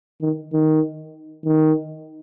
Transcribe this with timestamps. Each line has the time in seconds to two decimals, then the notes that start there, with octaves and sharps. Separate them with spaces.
0.22 D#3
0.53 D#3
1.45 D#3